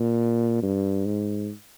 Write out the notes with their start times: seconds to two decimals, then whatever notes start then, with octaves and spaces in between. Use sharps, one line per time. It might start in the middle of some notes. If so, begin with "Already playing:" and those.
Already playing: A#2
0.63 G2
1.06 G#2